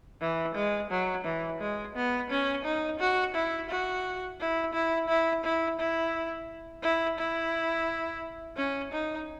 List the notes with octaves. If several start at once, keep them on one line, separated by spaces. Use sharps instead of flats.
E3
G#3
F#3
E3
G#3
B3
C#4
D#4
F#4
E4
F#4
E4
E4
E4
E4
E4
E4
E4
C#4
D#4